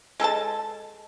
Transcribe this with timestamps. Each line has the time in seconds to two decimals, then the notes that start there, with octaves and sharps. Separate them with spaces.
0.20 G#3 A4 A#4 A5